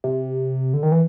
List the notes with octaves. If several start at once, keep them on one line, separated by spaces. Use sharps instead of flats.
C3
D3
D#3
E3